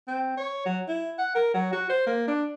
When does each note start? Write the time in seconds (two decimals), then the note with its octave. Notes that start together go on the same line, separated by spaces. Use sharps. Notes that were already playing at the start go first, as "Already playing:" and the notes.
0.08 C4
0.37 C#5
0.66 F#3
0.88 E4
1.18 F#5
1.35 A#4
1.54 F#3
1.73 F#4
1.90 C5
2.07 A#3
2.28 D4